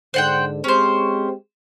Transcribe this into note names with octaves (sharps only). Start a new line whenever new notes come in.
G#2 D3 C5 F#5 G5
G#3 C4 C#4 G4 C5